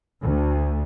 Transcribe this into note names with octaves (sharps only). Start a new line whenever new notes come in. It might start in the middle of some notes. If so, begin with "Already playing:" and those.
D2